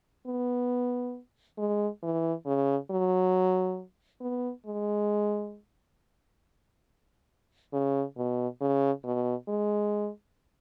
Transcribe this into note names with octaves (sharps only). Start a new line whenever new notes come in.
B3
G#3
E3
C#3
F#3
B3
G#3
C#3
B2
C#3
B2
G#3